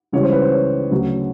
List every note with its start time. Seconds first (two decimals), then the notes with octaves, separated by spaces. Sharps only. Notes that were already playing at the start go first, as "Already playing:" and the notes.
0.13 C#2 C#3 E3 G3 C#5
0.23 C5
0.32 B4
0.42 C5
0.52 C#5
0.91 D2 C#3 F#3